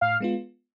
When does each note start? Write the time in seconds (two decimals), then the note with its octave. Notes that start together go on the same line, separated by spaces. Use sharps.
0.01 A2 F5
0.20 G#3 B3 F4